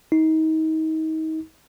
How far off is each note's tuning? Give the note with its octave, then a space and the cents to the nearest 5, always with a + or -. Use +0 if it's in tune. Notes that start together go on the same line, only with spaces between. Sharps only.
D#4 +30